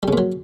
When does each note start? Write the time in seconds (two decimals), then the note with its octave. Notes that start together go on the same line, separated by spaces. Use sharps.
0.03 G3
0.08 C#3
0.13 A#2
0.18 F#3